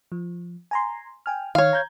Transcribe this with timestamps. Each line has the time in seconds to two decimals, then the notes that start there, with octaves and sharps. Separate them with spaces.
0.12 F3
0.71 G#5 A#5 C6
1.26 G5 G#5 F6
1.55 D#3 C#5 F5
1.73 A#5 G6 G#6